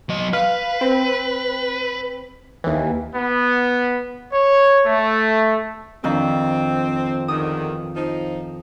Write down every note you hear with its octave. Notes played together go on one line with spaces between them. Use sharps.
F#3 D#5
B4 F5
C4
D#2 E3
B3
C#5
A3
F2 D#3 C4 D4
E2 D3 D#3 D#6
F3 D#4